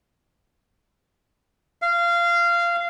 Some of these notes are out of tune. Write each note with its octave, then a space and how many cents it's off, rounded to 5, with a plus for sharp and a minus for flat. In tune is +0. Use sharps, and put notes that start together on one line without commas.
F5 -20